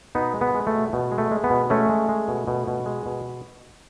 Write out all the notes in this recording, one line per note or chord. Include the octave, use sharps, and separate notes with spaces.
B2 B3 D#4
G#3
B3
G#3
A3
B2
B2
G#3
A3
G#3
B3
B2
G#3 A3 C#4
G#3
G#3
B2
B2
B2
G#3
B2